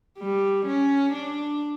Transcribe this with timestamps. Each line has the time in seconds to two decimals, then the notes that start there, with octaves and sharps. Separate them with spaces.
0.19 G3
0.66 C#4
1.13 D4